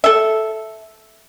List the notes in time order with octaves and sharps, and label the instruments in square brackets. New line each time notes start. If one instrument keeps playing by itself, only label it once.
[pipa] A4 E5